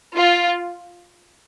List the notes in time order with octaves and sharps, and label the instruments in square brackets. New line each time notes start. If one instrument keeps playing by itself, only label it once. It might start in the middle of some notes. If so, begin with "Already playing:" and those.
[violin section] F4